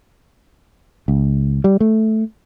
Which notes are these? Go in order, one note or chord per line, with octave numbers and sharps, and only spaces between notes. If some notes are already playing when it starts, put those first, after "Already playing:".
C#2
G3
A3